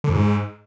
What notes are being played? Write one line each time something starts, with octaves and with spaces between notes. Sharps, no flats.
D3
F2
G#2